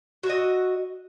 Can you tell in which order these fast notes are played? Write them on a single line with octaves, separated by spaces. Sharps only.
F#4 E5 D#5